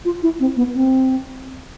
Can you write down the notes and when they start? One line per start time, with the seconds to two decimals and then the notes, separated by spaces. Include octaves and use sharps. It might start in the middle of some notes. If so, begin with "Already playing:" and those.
0.05 F4
0.23 E4
0.40 C4
0.57 B3
0.74 C4